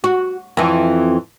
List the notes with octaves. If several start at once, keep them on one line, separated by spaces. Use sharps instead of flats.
F#4
F2 E3